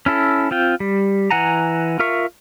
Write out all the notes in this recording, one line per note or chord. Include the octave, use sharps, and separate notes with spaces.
C#4 E4 A4
C4 F4 G5
G3
E3 F#5 G#5 A#5
F4 A#4 E5 C#6